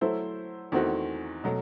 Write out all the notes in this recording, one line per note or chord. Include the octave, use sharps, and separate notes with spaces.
F#3 A3 E4 A4 C5
E2 D#3 A3 C4 F#4
B2 F#3 A3